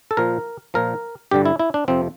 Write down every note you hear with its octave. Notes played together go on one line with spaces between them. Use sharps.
A4
A#2 F3 A#4
A#2 F3 A#4
G2 D3 G3 G4
E4
E4
D4
F2 C3 F3 C4